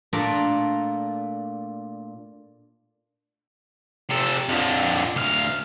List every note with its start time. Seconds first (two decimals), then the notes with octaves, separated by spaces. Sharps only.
0.13 A#2 A3 D4 F4 A4 A#4
4.10 C3 A4
4.48 F2 D3
5.16 D2 F5